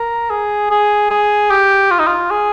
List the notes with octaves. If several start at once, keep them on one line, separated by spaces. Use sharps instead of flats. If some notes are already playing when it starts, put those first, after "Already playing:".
Already playing: A#4
G#4
G#4
G#4
G4
F4
D#4
F4
G#4